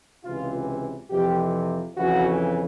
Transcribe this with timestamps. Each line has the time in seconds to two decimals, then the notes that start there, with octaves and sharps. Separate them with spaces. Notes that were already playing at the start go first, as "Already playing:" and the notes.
0.24 C#2 C3 E3 F4
1.10 F2 C3 E3 G4
1.97 F2 C#3 E3 F#4